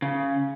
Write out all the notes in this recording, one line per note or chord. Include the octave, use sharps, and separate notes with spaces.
C#3